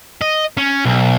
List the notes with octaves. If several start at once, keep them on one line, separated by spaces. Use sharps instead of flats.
D#5
C#4
B1